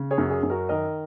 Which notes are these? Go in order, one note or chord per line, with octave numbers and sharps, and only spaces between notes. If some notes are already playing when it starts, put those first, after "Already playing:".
Already playing: C#3
G#4 C#5
F#2
G#4
F#2
F#4 A#4
D#3 A#4 D#5